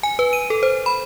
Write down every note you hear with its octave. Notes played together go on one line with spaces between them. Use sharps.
G#5
B4
D#7
A4
C5
B5